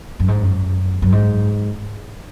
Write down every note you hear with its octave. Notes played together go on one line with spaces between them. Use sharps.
F#2
G#2
F#2
F#2
G#2